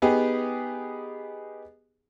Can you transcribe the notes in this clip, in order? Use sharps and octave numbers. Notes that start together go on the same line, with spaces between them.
B3 D#4 G4 G#4